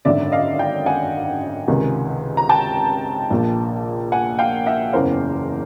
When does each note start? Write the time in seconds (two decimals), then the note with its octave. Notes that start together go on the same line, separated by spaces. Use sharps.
0.05 G#1 F#2 D3 D5 E5
0.32 D#5 F5
0.59 F5 G5
0.86 F#5 G#5
1.68 C#2 C3 D#3
2.37 A#5
2.49 G5 A5
3.30 A#1 A#2
4.12 F#5 G#5
4.39 F5 G5
4.66 E5 F#5
4.93 F#1 E2 C#3 E3 A#4 C5